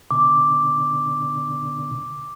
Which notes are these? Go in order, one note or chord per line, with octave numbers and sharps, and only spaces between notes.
B2 D3 D6